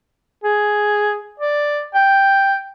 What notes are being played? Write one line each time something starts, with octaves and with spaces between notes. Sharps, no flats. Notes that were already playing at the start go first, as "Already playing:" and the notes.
G#4
D5
G5